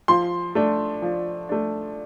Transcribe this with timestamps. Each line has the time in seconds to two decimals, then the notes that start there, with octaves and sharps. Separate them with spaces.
0.08 F3 C6
0.55 A3 D4
1.02 F3
1.49 A3 D4